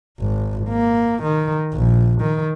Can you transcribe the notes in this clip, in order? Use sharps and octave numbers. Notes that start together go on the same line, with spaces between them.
G#1
A#3
D#3
A#1
D#3